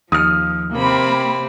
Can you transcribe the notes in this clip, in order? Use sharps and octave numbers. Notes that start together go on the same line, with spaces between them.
D#2 F3 D#6 F6
C3 A#3 C4 B5